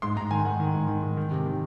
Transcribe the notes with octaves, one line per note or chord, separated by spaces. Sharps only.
G#2 C6
G#2 A#5
D#3 G#5
D#3 F#5
D#3
G#2
D#3
G#2
D#3
C3
D#3